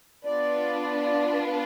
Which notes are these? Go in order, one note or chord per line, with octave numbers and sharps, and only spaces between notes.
B3 D4 F4 B4 D5